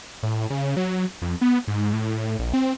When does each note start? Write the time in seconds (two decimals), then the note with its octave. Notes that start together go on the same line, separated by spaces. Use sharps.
0.23 A2
0.50 C#3
0.77 F#3
1.22 F2
1.41 B3
1.68 G#2
1.93 A2
2.39 A#1
2.54 C4